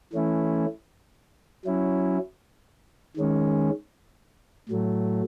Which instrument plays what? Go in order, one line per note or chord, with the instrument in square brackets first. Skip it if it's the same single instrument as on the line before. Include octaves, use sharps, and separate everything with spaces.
[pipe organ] E3 A3 C#4 E4
F#3 C#4 E4
D#3 G#3 C#4
A2 F#3 A3